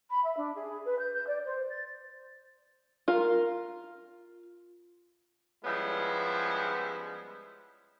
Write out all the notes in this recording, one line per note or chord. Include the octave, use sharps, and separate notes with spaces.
B5
E5
D4
G#4
B4
G6
G6
D5
C5
A6
F4 A#4
F3 G3 G#3 B3 C#4 E4